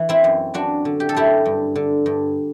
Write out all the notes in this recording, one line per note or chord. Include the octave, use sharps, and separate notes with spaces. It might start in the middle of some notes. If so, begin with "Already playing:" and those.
Already playing: E3
C4 E4
F#2
F#2 D4 F#4
D3
G4
A4
F#2 E4 G4
G2
D3
G2